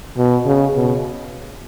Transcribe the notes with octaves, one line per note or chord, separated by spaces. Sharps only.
B2
C#3
B2